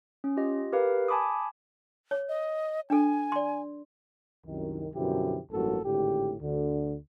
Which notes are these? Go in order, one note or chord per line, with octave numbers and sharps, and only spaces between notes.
C#4
F4 G4 D#5
G4 A#4 B4 F5
G#5 A5 B5 D6 D#6
C#5
D#5
D4 A4 G#5
D5 C6
C2 F#2 D#3
F#2 B2 D3 F3 E4 G4
A1 G2 F#3 A#3 F#4 A4
G#1 A2 D3 G4
D2 D3